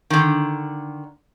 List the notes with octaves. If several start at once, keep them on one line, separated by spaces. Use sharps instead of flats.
D3 D#3